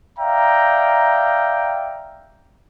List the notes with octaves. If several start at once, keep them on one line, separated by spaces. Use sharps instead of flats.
D5 E5 F5 G5 A#5